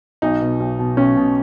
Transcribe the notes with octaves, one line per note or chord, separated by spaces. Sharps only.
B1 D#4
B2
B1
B2
B1 C#4
B2